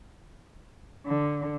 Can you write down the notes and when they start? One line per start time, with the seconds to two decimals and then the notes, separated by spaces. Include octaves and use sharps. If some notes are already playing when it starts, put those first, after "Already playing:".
1.07 D3